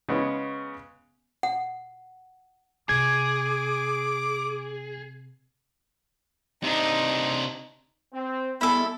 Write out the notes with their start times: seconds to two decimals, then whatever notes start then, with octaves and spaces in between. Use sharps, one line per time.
0.09 C#3 G#3 B3 C#4
1.43 F#5
2.89 C3 G#4 D6 G#6
6.64 C3 D4 D#4
8.14 C4
8.61 G3 G#3 B3 E4 A4